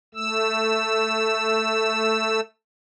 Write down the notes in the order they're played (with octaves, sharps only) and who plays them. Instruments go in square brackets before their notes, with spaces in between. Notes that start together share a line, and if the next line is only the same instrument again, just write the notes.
[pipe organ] A3 E6